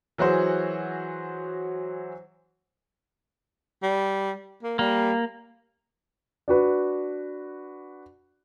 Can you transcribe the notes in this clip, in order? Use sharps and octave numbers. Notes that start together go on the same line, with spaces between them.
E3 F#3 F#4 G#4 C5
G3
A#3
G3 A#3
D4 F#4 B4